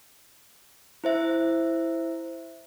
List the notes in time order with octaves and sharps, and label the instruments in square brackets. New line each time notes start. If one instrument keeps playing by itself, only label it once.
[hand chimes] E4 C5 E5